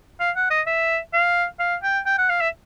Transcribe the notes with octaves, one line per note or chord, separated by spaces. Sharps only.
F5
F#5
D#5
E5
F5
F5
G5
G5
F#5
F5
E5